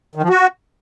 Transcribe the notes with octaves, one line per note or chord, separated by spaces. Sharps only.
D#3
F3
F#4